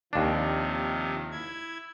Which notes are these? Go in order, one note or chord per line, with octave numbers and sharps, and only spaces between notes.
D#2 C3 D#3 F3 D4
E4 G#6